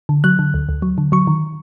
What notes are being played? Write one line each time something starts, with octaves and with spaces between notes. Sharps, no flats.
D3
F#3 F#6
D3
D2
D2
F#3
D3
F#3 C#6
D#3